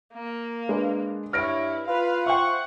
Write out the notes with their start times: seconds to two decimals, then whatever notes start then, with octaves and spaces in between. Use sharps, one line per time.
0.13 A#3
0.69 G#3 D4 B4
1.33 G2 E4 C#5 F6 A#6 D7
1.88 F4 B4 F5
2.26 C5 E5 F#5 G5 C#6